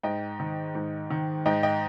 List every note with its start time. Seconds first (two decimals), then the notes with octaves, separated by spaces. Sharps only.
0.03 G#2 D#5 G5
0.40 D#3
0.75 G#2
1.10 D#3
1.46 G#2 D#5 G5
1.63 D#5 G5